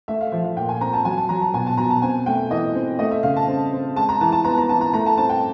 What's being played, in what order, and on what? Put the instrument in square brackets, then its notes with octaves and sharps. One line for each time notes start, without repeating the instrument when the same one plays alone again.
[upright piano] A3 E5
F5
F3 E5
F5
A#2 G5
G#5
C4 A#5
A5
F#3 G#5
A5
F#3 A#5
A5
B2 G#5
A5
B2 A#5
A5
C4 G#5
A3 G5
E3 D#5
C4
A3 D#5
E5
C#3 F5
A5
C4
C4
G#3 A5
A#5
E3 A5
A5
B3 A#5
A#5
E3 A5
A#5
A3 A#5
A5
C4 A5
G5